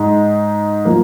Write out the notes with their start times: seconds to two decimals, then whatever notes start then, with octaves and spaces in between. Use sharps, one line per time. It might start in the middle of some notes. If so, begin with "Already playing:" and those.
Already playing: G#2 G#3 D#4
0.85 F3 A#3